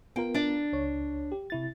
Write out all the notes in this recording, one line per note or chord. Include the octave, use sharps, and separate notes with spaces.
B3 F4 A#4 G5
D4 D5
C#2 C#5
G4
C3 E4 A6